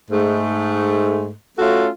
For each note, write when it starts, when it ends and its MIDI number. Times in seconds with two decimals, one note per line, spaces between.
0.11 1.32 44
0.11 1.32 57
1.59 1.89 57
1.59 1.89 61
1.59 1.89 65
1.59 1.89 66
1.59 1.89 69